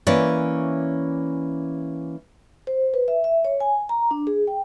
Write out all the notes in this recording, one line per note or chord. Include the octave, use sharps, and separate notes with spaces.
E3 A#3 C#4 C#5 D5 E5
C5
B4
E5
E5
C#5
G#5
A#5
D4
G#4
G5